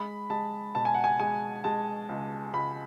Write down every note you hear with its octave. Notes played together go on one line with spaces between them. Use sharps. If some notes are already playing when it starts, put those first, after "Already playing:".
Already playing: G#3 B5
G#3 A5
B2 A5
G#5
F#5
G#5
G#3 G#5
G#3 A5
C#2
C#2 B5